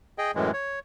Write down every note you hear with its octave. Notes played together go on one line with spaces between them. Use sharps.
G#4 D#5 G5
F#2 A2 E3 G#3
C#5